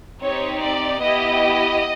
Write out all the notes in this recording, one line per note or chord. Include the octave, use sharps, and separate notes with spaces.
C4 D#4 G4 C#5
D5
B3 E4 G4 D#5